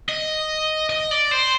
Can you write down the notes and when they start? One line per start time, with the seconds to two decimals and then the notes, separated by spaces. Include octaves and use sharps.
0.09 D#5
0.90 D#5
1.11 D5
1.31 C5